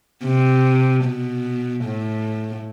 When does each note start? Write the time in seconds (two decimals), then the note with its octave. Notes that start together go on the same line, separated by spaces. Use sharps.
0.25 C3
1.05 B2
1.84 A2